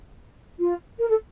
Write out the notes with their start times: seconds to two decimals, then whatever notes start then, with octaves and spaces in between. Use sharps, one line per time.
0.59 F4
0.99 A#4
1.09 A4